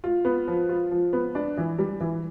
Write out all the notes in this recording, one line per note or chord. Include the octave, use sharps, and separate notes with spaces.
F4
B3
F3
F4
F3
B3
D4
E3
G3
E3